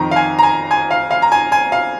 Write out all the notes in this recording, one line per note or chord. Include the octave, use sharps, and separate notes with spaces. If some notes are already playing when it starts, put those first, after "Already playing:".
Already playing: F2 D#3 A#5
F5
G#5
A#5
G#5
G#5
F5
F5
A#5
G#5
G#5
F5